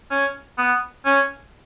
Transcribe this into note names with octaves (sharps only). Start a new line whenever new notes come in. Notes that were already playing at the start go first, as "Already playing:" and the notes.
C#4
B3
C#4